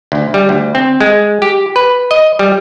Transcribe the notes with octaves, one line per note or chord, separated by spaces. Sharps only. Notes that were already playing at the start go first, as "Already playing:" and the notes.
D2
G3
D2
C4
G#3
G4
B4
D#5
G3